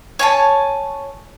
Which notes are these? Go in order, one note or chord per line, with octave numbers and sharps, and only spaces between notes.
C#5 G#5 A5